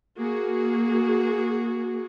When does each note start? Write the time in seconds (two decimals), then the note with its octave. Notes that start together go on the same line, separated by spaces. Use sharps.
0.18 A#3 F#4 G#4